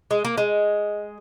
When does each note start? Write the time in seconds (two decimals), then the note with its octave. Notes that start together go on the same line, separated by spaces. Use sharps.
0.11 G#3
0.25 A#3
0.37 G#3